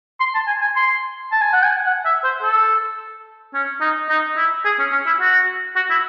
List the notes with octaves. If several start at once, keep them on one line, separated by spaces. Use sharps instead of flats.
C6
A5
G#5
G#5
C6
A5
G#5
F#5
G#5
F#5
E5
C5
A4
C#4
D#4
D#4
E4
G#4
C#4
C#4
E4
F#4
F#4
E4